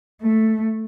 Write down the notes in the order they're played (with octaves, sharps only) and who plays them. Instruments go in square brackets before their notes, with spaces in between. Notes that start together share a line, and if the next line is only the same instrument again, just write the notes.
[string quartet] A3